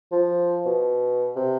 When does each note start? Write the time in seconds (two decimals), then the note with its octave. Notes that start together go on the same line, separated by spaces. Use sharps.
0.12 F3
0.65 B2
1.36 C3